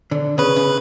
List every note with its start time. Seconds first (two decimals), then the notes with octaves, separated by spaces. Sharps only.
0.11 D3
0.38 C#3 B4
0.56 C#3